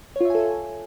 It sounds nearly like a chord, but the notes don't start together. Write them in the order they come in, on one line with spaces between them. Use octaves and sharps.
C#5 F4 E5 G#5 A4